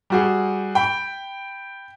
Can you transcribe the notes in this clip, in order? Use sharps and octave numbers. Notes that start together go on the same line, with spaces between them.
G3 F#4 G#4
G5 B5